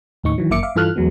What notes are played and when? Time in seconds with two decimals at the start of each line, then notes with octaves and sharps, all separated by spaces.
0.24 D#2 A2 D#4 C#6
0.38 D#3 E3 F#3
0.50 G1 F#2 A#3 E5 D6 C#7
0.63 E5 F5 D6
0.75 G2 E3 F4 A4 F6 F#6
0.96 E2 F#3 G#3 B3